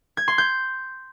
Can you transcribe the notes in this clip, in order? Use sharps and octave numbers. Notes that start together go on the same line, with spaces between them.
G#6
C6
G6